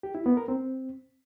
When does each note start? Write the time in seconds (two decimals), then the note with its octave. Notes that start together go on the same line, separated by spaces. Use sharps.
0.03 G4
0.15 E4
0.26 B3
0.37 A#4
0.48 C4